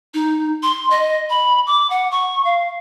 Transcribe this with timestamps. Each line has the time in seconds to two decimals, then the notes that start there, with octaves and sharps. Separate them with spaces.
0.14 D#4
0.63 C6
0.90 D#5
1.30 B5
1.67 D6
1.90 F#5
2.11 C#6
2.45 F5